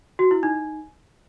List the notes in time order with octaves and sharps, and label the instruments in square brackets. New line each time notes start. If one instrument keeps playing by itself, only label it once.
[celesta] F#4
E4
D#4